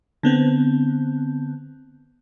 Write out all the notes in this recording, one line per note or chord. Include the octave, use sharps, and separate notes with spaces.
D3 B3 C4